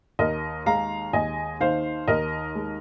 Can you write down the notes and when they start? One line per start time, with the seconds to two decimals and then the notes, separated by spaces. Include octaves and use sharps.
0.19 D#2 A#4 D#5
0.66 G#3 F5 A#5
1.13 D#2 D#5 G#5
1.61 D#3 C5 F5
2.08 D#2 A#4 D#5
2.55 G#3